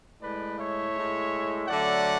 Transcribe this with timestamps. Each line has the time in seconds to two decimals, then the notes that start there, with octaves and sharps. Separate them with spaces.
0.21 A2 G#3 B4 D5
0.58 C#5 E5
0.94 A2 G#3
1.67 D3 F#3 A3 D5 F#5